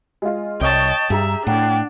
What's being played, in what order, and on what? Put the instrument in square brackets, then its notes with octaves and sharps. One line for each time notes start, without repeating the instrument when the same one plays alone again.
[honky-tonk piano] G#3 F4
[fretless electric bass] C2 [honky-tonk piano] C#5 D#5 C#6 [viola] G5 A5
[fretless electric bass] G2 [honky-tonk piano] G4 G#4 A#5 [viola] E5
[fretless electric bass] A2 [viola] D4 [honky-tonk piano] F#5 [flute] G5